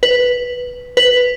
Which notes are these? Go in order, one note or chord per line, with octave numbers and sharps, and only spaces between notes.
B4
B4